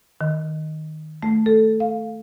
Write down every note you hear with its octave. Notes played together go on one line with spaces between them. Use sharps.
D#3
A3
A4
F5